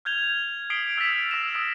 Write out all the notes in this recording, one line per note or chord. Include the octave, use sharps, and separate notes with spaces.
F6 G6 G#6 F7 G7
D#6 B6 C7 D7 F#7 G7
E6 F6 G#6 A6 B6 E7
E6 A#6 E7
D#6 E6 D7